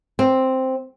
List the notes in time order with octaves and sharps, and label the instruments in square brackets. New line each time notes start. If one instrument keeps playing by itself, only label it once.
[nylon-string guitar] C4